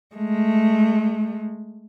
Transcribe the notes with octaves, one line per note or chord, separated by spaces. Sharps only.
G#3 A3